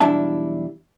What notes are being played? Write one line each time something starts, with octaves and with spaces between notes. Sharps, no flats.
B1 E2 G3 D4 E4 A5